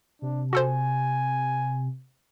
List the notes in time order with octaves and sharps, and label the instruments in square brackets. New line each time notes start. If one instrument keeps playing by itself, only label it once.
[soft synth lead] C3 [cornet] D4
[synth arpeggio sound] F#4 A4 C5 [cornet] G#5